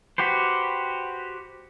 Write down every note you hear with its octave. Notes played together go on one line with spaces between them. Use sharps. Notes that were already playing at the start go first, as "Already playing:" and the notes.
F#4 G4 B4 C5